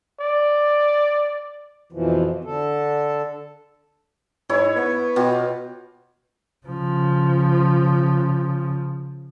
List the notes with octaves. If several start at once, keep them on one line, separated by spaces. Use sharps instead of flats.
D5
F2 B2 E3 F3
D3 A4
G#2 E4 C#5
B3
B2 F4 G4
C#3 F3